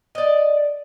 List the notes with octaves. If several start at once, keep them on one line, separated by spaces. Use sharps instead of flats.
D5 D#5